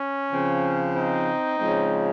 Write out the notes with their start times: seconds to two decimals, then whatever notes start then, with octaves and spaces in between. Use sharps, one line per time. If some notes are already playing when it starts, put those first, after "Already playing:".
Already playing: C#4
0.32 C#3 F3 C4
0.95 C4 D#4
1.59 C#3 F3 G#3 C4